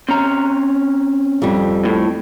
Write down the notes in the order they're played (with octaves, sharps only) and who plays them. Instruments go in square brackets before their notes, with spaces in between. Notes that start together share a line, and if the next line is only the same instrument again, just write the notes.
[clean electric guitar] C4 C#4 A#5
[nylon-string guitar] F2 G3
[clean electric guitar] A2